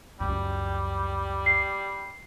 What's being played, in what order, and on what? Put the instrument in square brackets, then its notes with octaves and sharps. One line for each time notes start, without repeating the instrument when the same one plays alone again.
[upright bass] C#2 F#2 [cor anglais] G3
[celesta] C7